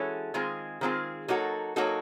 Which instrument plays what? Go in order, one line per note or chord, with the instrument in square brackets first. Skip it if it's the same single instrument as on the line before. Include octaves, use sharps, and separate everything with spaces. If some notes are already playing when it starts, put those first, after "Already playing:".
Already playing: [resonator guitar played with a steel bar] E3 G#3 C#4 F#4 A4
D#3 G#3 C4 F4 G#4
D#3 G#3 C4 F4 G#4
F#3 A#3 D#4 F#4 A4
F#3 A#3 D#4 F#4 A4